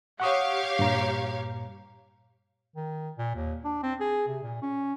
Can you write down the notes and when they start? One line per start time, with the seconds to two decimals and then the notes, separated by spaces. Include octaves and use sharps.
0.20 G4 C#5 F5 F#5 C#6 D#6
0.79 G2 A#2 A#5
2.76 D#3
3.18 A#2
3.35 D#2
3.64 D4
3.83 C4
4.00 G#4
4.28 C3
4.43 A#2
4.62 C#4